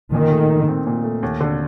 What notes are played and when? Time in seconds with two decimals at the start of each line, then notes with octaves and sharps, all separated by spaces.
0.14 A#2 D#3
0.32 A3
0.50 D#4
0.69 C4
0.87 A#2
1.04 A3
1.23 D#2
1.41 D3